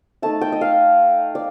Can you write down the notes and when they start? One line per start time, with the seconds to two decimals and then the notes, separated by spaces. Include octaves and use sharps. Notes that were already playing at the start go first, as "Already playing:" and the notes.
0.22 A3 D#4 A5
0.41 G5
0.52 D#5
0.61 F5
1.35 D5